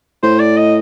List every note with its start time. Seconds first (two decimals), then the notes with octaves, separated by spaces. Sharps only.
0.23 A2 C5
0.39 D5
0.57 D#5